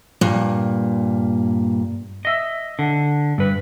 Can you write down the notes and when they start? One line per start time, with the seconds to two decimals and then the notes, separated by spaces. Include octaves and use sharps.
0.21 G2 A#2
2.25 D#5 E5
2.79 D3
3.38 G2 B4